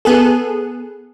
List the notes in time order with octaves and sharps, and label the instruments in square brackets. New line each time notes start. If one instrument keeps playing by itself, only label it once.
[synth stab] B3 G#4 A4